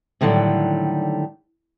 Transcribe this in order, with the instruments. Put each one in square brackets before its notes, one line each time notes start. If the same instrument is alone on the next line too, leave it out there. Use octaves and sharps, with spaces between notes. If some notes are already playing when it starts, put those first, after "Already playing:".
[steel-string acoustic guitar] A2 D3 D#3 F#3 G3